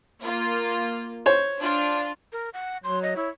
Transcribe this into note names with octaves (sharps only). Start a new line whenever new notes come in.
A#3 F4
C5 C#5
D4 F4
A#4
F#5
F#3 C6
D#5
E4 C#5